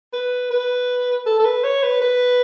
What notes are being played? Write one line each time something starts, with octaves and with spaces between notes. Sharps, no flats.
B4
B4
A4
A4
B4
C#5
B4
B4